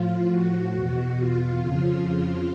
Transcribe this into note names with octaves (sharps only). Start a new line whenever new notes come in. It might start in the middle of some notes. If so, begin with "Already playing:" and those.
Already playing: A2 F3 F4
F#4
E2 B2
F4
F2 C#3 F3